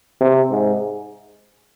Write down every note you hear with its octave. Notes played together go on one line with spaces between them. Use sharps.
C3
G#2